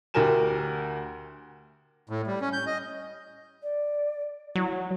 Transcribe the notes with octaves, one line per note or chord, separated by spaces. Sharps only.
D2 F#4 G4 A#4 G#5 E7
A2
G3
C#4
G6
D#5
D5
F#3 E4